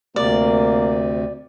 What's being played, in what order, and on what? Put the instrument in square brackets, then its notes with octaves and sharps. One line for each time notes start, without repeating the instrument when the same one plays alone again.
[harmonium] D2 C3 [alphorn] A#3 [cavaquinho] D5